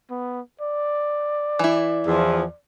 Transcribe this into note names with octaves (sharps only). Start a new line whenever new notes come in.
B3
D5
E3 E4
E2 F3